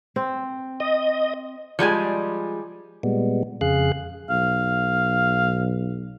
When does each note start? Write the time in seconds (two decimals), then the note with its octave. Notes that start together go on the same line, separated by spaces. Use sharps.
0.16 C4
0.80 D#5
1.79 F3 G3 G#3 G#5
3.03 A#2 G3 G#3 B3
3.61 F2 C#3 G#4 F5 F#6
4.30 B1 F5